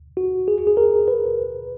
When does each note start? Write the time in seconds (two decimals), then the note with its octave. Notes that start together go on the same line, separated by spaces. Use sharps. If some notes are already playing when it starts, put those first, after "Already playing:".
0.17 F#4
0.48 G#4
0.67 G#4
0.77 A#4
1.08 B4